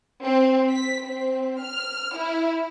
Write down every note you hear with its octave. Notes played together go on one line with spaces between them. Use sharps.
C4
B6
C4
F6
E4